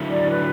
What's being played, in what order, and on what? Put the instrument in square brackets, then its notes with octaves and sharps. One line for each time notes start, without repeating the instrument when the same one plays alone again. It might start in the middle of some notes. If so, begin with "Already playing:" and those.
Already playing: [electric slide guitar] D3 F#3 A3 E4
[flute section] D5
B4